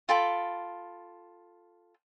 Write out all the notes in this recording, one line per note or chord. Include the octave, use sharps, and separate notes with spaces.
F4 A4 G5 B5